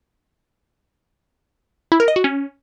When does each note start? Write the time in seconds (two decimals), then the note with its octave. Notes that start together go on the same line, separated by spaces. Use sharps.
1.92 E4
2.00 A#4
2.08 D#5
2.16 F#4
2.24 C#4